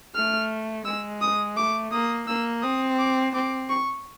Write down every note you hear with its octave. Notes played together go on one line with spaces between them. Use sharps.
A3 F6
G#3 E6
D#6
A3 D6
A#3 D#6
A#3 E6
C4 D#6
D6
C4 D6
C#6